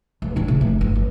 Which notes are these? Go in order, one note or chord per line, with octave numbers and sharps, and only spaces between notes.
E1
A#2 C#4
C#3
F1
G1
G2